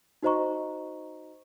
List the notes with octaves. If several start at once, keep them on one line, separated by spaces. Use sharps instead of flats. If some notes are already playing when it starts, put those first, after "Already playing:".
D#4 F#4 C5 D#5 A#5 C#6